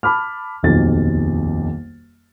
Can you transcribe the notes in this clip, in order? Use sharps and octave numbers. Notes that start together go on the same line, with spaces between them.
A5 B5 D6 F6
D#1 B1 F2 A6